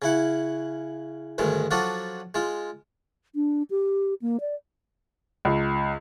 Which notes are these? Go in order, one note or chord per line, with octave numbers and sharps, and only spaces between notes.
C#3 E4 F#5
D2 G2 D#3 G#3
F3 F#3 D4 F4 F#4 A4
G#3 F4
D4
G4
A#3
D5
C#2